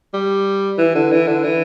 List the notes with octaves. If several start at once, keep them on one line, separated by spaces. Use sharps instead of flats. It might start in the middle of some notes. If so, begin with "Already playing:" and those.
G3
E3
D3
E3
D3
E3